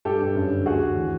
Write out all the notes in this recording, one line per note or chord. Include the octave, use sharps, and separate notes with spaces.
G2 G4 A4
G2
F#2
D3
D2 F#4 G#4
D2
E3